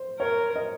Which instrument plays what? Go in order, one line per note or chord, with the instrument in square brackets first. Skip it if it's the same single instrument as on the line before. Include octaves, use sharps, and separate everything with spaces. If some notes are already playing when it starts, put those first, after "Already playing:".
Already playing: [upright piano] C5
[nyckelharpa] A#4 [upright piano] C#5
[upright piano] D#5